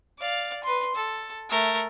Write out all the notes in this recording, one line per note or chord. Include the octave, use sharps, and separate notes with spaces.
D5 F5
B4 C6
A4
A3 A#4